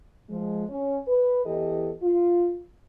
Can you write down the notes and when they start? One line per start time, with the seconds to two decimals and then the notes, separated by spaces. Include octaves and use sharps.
0.29 F3 G#3
0.68 C#4
1.07 B4
1.45 E2 E3 G4 A4 D#5
2.02 F4